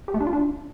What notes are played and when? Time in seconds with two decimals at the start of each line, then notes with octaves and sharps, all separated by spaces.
0.08 G4
0.14 A3
0.20 D4
0.27 F4
0.33 D4